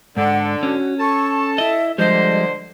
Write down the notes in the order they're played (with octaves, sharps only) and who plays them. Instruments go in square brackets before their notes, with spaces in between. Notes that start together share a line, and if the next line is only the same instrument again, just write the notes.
[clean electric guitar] G#2 [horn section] D3 [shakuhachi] F#5
[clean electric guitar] C#4 [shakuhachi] F#4
[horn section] A4 A5 [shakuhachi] C#6
[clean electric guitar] E4 D#5 [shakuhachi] E5
[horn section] D3 C5 [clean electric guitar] F3 G3 G#3 [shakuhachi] D#5